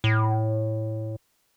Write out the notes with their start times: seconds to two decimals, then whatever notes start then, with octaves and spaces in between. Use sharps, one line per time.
0.04 A2